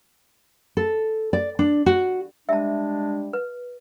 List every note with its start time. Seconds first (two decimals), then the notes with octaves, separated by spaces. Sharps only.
0.77 A4
1.33 D5
1.59 D4
1.86 F#4
2.49 G3 G#3 D4 E5 A5
3.33 B4